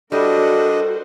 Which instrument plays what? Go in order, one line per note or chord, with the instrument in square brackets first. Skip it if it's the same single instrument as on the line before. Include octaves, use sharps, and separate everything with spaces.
[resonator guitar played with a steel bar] G3 E4 [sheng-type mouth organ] D4 D#5 [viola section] F#4 A#4 C5 [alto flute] A4